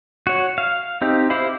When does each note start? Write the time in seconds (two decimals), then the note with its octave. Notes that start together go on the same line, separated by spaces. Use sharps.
0.27 F#4 C#5
0.58 F5
1.01 C4 D#4 G4
1.30 E4 G4 C5 F5 B5